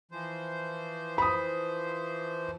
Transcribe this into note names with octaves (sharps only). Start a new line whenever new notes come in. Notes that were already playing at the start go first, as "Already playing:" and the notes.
E3 F3 C5
B5 D#6